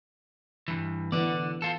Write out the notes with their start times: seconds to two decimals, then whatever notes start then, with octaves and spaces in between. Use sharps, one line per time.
0.68 G2 E3
1.12 D3 E3 B3 D5
1.62 F4 A4